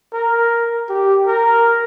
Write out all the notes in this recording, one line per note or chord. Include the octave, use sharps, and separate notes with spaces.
A#4
G4
A#4